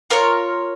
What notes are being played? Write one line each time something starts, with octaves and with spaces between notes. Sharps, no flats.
F4 A#4 C#5